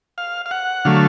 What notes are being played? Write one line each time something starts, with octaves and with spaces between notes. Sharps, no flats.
F5
F5
F#5
D3 F#3 A3 F5